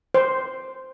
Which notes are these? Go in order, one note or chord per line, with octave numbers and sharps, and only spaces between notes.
C5